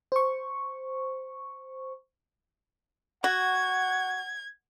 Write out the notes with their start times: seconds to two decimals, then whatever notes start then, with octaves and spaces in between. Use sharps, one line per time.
0.12 C5 C#6
3.24 F#4 F#5 G#6